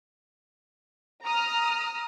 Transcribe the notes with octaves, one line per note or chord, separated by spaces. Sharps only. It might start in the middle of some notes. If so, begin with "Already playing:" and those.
A#5 D#6 F6